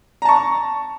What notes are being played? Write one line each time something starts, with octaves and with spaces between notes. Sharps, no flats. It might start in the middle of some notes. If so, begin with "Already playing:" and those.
A5 A#5 C#6